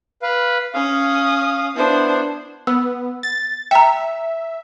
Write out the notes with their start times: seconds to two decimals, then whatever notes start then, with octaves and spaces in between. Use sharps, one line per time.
0.22 B4 F5
0.74 C#4 F5 D#6
1.76 B3 D4 E4 C5
2.67 B3 E6
3.23 A6
3.71 E5 G5 A#5